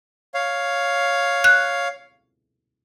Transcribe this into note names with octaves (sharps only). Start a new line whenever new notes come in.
C#5 F5
F#6